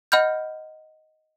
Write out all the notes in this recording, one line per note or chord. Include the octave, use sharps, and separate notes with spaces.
D#5 F#5 B5 F6 G6